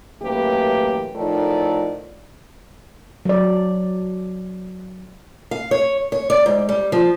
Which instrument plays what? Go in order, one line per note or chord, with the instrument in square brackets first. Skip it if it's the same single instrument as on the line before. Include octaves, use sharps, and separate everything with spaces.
[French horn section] F#2 A2 E3 A#3 G4 B4
A2 F3 D#4 A4 A#4 D5
[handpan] F#3 D5
[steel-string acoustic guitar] F5
C#5
C#5
D5
G#2
G3
F3